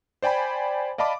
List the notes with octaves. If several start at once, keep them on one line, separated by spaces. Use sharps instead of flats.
C5 D5 G5 G#5 B5
D5 D#5 F5 A5 B5 D6